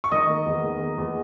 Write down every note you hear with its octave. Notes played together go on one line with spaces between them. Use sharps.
C#6
D#3 D#5 D#6
A#3
E2
D#3
A#3
E2